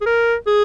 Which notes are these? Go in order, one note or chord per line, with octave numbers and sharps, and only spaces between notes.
G#4
A#4
G#4